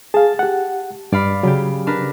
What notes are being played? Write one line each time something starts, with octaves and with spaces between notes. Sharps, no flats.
G#4 F5 A5
G4 F#5
G2 D5 F5 B5
C#3 F#3 G4
D4 A#4 B4